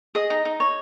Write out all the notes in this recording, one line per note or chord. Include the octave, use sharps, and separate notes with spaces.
G#4 D#5
D#4
D#4
C#5